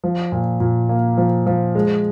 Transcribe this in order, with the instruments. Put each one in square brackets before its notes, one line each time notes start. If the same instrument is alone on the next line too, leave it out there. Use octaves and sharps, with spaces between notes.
[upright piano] F3
A#2
A#2
A#3
F3
F3
G#3